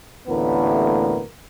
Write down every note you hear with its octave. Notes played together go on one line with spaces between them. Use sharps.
A1 D2 A2 A#3 B3 A#4